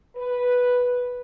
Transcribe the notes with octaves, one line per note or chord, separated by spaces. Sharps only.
B4